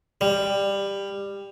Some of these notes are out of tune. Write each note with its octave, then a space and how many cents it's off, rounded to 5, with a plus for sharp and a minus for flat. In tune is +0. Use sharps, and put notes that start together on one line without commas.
G3 +15